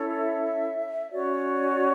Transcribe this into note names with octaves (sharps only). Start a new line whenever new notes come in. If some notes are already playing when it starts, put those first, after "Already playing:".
Already playing: C#4 E4 A4 C#5
E5
C#4 F#4 C#5 D5